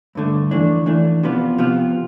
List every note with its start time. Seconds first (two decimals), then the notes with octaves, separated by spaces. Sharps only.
0.15 G2 D3 A3
0.51 F2 E3 A3 D4
0.86 F2 E3 A3 D4
1.23 C3 F3 B3 F4
1.58 C3 F3 B3 F4